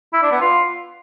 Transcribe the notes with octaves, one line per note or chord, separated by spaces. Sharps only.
E4
D4
B3
F4